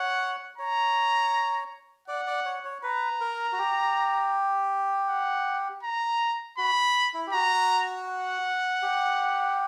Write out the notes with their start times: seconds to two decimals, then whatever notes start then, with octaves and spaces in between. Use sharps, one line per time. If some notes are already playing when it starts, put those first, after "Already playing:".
Already playing: C#5 F#5
0.58 C#5 A#5
2.08 D5 F#5
2.27 D5
2.45 C#5
2.65 C#5
2.83 B4 A#5
3.21 A#4
3.53 F#4
3.58 G4
5.08 F#5
5.83 A#5
6.58 F#4 B5
7.14 E4
7.27 G4
7.33 F#4 A#5
8.07 F#5
8.82 G4